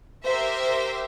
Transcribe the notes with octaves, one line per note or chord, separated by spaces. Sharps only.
G4 A#4 C5 E5